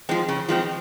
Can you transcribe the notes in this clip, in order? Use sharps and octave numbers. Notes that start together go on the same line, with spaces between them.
F3 G#3 C4
C#3
F3 G#3 C4